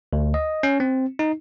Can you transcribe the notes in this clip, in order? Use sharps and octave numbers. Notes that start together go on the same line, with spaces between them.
D2
D#5
C#4
C4
D#4